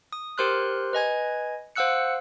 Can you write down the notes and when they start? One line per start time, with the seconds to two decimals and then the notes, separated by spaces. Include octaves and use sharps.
0.12 D#6
0.38 G4 A#4 C5 C6 F6 F#6
0.93 B4 D#5 G#5 G#6
1.75 C5 F5 F#5 E6 F#6 C#7